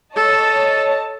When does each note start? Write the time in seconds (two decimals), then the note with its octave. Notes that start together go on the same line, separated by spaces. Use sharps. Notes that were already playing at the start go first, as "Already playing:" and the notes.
0.16 A4 C#5 D#5 A5